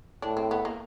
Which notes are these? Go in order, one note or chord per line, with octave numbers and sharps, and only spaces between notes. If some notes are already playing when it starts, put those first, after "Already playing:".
A2 D4
C4
B3
A#3